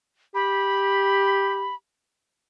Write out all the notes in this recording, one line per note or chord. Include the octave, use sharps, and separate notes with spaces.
G4 B5